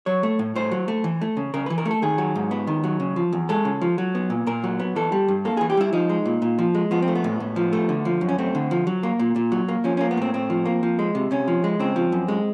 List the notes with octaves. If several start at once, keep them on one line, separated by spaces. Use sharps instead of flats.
F#3 C#5
A3
A2
A2 C5
F#3
A3
E3
A3
C#3
C#3 A#4
B4
E3
A#4
A3
A4
D#3 G#4
F#3
G#2
B3
D#3
F#3
C#3
F3
E2
G#3 A4
C#3
F3
F#3
B3
A#2
A#2 A#4
F#3
B3
E3 A4
G3
G2
A#3 A4
G#4
E3
G4
G3 E4
F3 D#4
G#3
A#2
A#2
F3
G#3
F3 B3
C4
A3
B3
A2
A2
F3
A3
D3
F3
F#2
C#4
A3 C4
D3
F3
F#3
A#3
A#2
A#2
F#3
A#3
F3 C#4
A#3 C#4
B3
A2 C4
A2 C4
F3
A#3
F3
G#3
C3
C3 C#4
F3
G#3
C#3 C4
F3
F#2
G#3